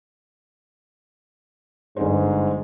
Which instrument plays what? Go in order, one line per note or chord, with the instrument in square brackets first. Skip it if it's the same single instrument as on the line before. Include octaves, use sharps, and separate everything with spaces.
[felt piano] G1 G#4 C5 [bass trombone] G#2